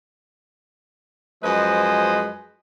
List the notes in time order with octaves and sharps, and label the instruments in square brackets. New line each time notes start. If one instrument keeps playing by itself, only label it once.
[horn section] F#2 F3 G#3 B4 C5 D#5